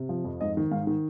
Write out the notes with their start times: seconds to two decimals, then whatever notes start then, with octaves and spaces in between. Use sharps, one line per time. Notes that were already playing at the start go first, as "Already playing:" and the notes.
Already playing: C3
0.09 F3
0.25 F2
0.41 G#2 D#5
0.57 D#3
0.71 G#2 F5
0.87 D#3